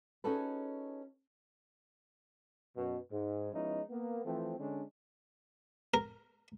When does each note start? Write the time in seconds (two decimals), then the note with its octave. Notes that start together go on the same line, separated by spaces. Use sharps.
0.24 C#4 D#4 F#4 G#4 A4 B4
2.76 F#2 B2
3.11 G#2
3.53 F3 G#3 B3 C#4 D#4 E4
3.90 A#3 B3
4.25 E3 F3 A3 C4
4.59 D3 G#3 C#4 D4
5.94 A#4